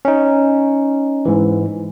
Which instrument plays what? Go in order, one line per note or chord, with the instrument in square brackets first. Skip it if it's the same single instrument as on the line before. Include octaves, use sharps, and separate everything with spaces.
[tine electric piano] C#4 D#4
G#2 E3